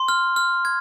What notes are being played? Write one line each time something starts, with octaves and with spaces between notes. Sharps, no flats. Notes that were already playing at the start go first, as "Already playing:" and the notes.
Already playing: C6
F6
F6
G#6